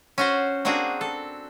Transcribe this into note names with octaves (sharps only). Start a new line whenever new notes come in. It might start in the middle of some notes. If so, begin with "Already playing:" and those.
C#4 F#4 C5
A#3 C4 D4 F#4 G#4
A4